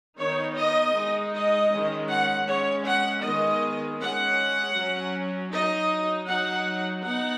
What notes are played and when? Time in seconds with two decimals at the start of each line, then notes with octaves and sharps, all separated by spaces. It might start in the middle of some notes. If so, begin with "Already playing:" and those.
0.18 D#3 B3 D#4 C#5
0.58 D#5
0.95 G#3 D#4
1.34 D#5
1.72 D#3 G#3 C#4
2.09 F#5
2.47 G#3 C#4 C#5
2.85 F#5
3.23 D#3 G#3 B3 D#5
3.99 G#3 C#4 F#5
4.77 F#3 C#4
5.52 F#3 D#4 D#5
6.28 F#3 D#4 F#5
7.04 B3 D#4 F#5